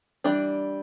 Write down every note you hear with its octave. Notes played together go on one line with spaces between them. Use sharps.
E3 G3 D4